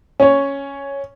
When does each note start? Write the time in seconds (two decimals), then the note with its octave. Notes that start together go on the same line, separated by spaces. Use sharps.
0.20 C#4 C#5